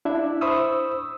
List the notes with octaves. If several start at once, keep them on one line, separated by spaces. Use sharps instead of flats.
D4 E4 E5
C5 B5 C#6 D#6 E6